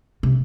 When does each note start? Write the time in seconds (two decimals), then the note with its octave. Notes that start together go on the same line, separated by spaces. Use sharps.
0.23 C3